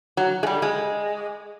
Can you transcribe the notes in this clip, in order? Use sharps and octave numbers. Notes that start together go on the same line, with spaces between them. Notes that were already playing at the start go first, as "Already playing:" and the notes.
F#3
G#3
G3
G#3